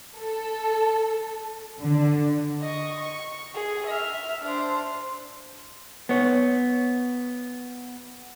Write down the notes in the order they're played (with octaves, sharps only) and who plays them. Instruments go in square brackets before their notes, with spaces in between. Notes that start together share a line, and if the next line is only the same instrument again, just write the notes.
[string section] A4
D3
[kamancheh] D#5 C#6
C#6
G#4
E5 F6
D4 C5
[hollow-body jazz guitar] B3 C#5